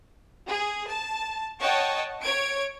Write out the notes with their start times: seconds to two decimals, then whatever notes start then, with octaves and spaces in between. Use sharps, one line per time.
0.48 G#4
0.90 A5
1.61 C#5 D#5 F#5 G5 A5 C#6
2.21 C#5 G#6 D7